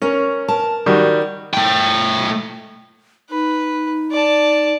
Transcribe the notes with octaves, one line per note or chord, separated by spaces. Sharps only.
C#4 A#4 C#5
A#4 A5
D#3 G3 F#4
A3 G5
D#4 B4
D5 A5